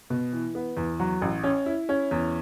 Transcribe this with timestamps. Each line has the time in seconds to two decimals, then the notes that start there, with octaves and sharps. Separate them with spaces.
0.10 B2
0.33 E3
0.55 B3
0.77 E2
1.00 F#3
1.22 A1
1.44 C#4
1.66 E4
1.89 C#4
2.11 E2